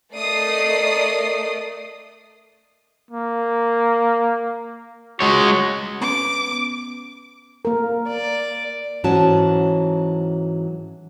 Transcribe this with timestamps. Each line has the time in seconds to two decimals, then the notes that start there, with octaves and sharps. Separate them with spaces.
0.13 A3 A#4 D5 D#5 D#6 C7
3.11 A#3
5.21 G#3 F#4 C#5
6.01 B3 C#4 B4 D6
7.65 A#3 A#4
8.08 D5
9.04 G#2 E3 F#3 C#4 F#4 A5